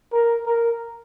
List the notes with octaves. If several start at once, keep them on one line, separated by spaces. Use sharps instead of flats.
A#4
A#4